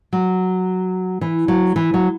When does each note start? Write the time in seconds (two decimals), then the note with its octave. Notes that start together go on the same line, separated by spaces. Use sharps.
0.13 F#3
1.21 E3
1.48 F#3
1.76 E3
1.94 F#3